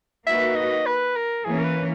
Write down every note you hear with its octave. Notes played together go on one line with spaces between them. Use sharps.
A#3 D#4 F#4 B4 E5
D#5
B4
A#4
E3 A#3 C#4 G#4
A#4
B4